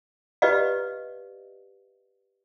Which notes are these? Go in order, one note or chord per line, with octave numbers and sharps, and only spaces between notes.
G4 B4 D5 D#5 F5